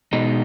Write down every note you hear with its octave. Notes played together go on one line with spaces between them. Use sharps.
B2 G#3 D#4